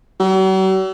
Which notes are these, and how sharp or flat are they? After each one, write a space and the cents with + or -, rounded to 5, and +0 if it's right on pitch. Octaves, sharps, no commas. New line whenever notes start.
F#3 +45